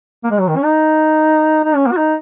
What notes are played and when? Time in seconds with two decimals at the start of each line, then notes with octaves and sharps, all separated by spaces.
0.24 A#3
0.31 G#3
0.40 F#3
0.48 D#3
0.57 C#4
0.64 D#4
1.64 D#4
1.75 C#4
1.86 A#3
1.92 F#4
1.97 D#4